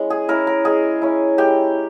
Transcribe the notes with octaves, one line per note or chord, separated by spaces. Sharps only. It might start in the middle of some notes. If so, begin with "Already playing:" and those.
Already playing: G#3 C#4 E4
G#4
C#4 E4 A#4
A#4
G#3 G#4
C#4 E4
G#3 G4